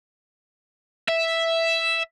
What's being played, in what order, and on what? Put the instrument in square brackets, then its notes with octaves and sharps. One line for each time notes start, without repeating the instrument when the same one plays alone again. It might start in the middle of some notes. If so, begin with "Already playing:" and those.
[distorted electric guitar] E5